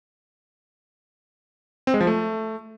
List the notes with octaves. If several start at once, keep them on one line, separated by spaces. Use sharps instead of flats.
C4
G#3
F3
A3